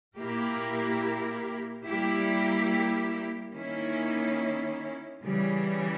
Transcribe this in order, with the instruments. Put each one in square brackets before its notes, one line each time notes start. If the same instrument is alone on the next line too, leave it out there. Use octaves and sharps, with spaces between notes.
[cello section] A#2 A#3 E4 G4 A#4
G3 A#3 E4 G4
D#3 A#3 C#4 E4
C#3 E3 G3